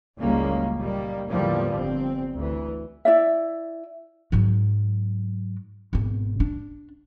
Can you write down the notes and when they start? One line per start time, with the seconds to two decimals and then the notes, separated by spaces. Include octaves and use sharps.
0.20 F#1 C#2 G3 G#3 A#3 C#4
0.76 A#2 D#3 G3 A#3
1.29 E2 A2 D3 F3 G3 A#3
1.75 G1 C4
2.37 D2 E3
3.05 E4 D5 E5
4.32 G#2 F#3
5.93 G#1 B2
6.40 D4